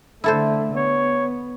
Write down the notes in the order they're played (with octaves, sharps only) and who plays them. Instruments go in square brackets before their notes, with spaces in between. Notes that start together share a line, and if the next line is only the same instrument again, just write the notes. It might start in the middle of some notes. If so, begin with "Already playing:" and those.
[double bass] D3 A3 [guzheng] E4 A4 C5
[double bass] B3 [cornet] C#5